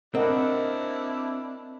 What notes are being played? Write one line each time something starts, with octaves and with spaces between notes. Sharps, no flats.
C4 D4 E4 A#4 D#5 F#5